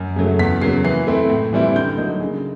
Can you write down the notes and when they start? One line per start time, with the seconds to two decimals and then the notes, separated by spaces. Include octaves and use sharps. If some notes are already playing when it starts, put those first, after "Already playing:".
Already playing: F#2
0.16 C#3 F#3 A3
0.39 E2 B6
0.61 C#3 F#3 A#3 C7
0.84 E3 C7
1.07 A3 C4 E4
1.30 A2
1.53 E3 G3 C4 E4
1.76 D3 G6
1.97 F#3 A#3 D#4
2.20 C#3